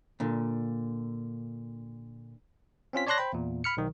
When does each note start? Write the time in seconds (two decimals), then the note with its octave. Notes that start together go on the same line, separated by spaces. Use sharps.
0.20 A#2 D3
2.93 C4 C#4 F4 B6
3.07 C#5 D5 A5 C6 F#6 A#6
3.18 C5 G5 B5
3.33 E2 A#2
3.64 B5 F6 C#7
3.77 B1 D#3